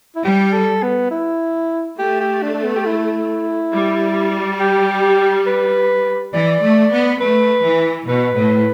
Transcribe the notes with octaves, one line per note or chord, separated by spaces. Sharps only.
E4
G3 G4
A4
B3
E4
A3 G4
G4
D4
D4
B3
G4
E4
G3
G4
B4
E3 D5
A3
B3
A3 B4
E3
B2 B4
A2